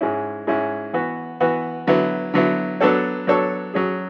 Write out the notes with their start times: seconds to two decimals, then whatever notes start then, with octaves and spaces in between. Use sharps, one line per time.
0.01 G#2 G#3 C#4 E4
0.47 G#2 G#3 C#4 E4
0.93 E3 B3 F#4
1.40 E3 B3 F#4
1.87 D3 F#3 B3 E4
2.34 D3 F#3 B3 E4
2.80 F#3 B3 D4 A4 C#5
3.27 F#3 B3 D4 A4 C#5
3.74 F#3 C#4 G#4